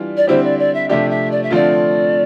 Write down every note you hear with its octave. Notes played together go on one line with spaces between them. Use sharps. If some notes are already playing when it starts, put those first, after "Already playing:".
Already playing: E3 G3 D4 F4
D5
D3 G3 C4 E4 G4 C5
D5
D5
E5
C3 F3 A3 D4 G4 E5
E5
D5
E5
D3 F3 A3 C4 F4 D5